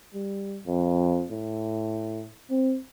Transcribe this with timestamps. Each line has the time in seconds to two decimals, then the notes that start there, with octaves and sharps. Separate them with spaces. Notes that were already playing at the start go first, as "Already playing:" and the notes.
0.14 G3
0.66 F2
1.31 A2
2.50 C4